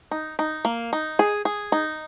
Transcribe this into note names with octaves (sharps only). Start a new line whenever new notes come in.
D#4
D#4
A#3
D#4
G#4
G#4
D#4